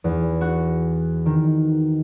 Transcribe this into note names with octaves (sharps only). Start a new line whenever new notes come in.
E2
F#4
D#3